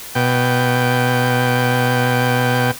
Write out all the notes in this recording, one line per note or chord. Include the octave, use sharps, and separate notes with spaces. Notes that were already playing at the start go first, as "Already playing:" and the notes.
B2 G5